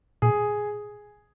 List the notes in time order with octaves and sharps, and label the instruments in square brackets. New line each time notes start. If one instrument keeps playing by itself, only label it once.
[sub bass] A#2 [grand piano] G#4